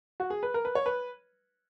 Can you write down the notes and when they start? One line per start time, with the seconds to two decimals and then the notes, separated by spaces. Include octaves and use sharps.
0.20 F#4
0.30 G#4
0.43 B4
0.54 A#4
0.65 B4
0.75 C#5
0.86 B4